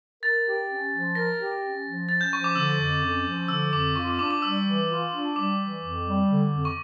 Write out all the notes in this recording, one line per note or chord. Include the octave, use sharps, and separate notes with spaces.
A#4 A6
G4
C#4
F3
A#4 A#6
G4
C#4
F3
C#4 A6
G6
F3 C#6
D6
D3 E6
F2
C#4
F3
D3 E6
F2 D6
F4 C#6
D6
D4 D6
D6
G3 E6
E3
F4
D4
G3 D6
E3
F2
G3
D3
F2
C#6